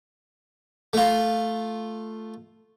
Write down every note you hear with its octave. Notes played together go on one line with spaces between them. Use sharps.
A3 F4